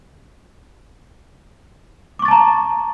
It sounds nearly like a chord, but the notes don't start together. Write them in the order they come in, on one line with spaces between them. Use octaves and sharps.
D6 C#6 A6 A5 A#5